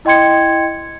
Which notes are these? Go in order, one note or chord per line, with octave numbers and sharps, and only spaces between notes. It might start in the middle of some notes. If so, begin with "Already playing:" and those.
E4 D#5 G5 C6 G#6 C#7